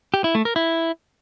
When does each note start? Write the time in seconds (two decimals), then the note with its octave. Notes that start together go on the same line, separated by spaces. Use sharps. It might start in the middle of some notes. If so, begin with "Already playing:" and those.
0.14 G4
0.24 E4
0.35 A3
0.45 A#4
0.56 E4